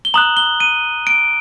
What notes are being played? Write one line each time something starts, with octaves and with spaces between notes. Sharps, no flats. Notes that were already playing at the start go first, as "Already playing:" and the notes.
G7
A#5 D#6 F#6 F#7
G7
D#7
D7